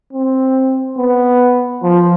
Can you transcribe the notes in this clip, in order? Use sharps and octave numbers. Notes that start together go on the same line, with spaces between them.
C4
B3
F3